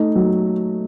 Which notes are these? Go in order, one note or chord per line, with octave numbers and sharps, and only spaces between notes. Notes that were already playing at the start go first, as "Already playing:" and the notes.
Already playing: A3 D#4
F#3